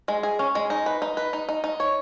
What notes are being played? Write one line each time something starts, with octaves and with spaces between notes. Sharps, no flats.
G#3
G#4
C#4
G#3
D#4
B4
D#4
B4
D#4
D#4
D#4
C#5